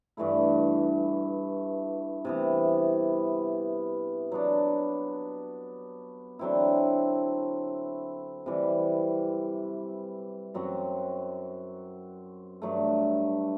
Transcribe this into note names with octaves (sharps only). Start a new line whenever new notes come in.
G2 E3 A3 E4
C3 E3 B3
F#3 B3 D4
D3 F#3 C4 E4
C3 E3 G3
F#2 F#3 C4 F#4
G2 F#3 A3